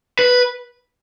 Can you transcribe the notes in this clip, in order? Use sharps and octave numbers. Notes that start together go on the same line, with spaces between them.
B4